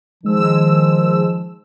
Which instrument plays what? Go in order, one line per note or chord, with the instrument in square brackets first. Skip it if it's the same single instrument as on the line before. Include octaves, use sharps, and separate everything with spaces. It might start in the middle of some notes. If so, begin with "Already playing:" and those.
[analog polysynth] D#3 G#3 E6 [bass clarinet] F3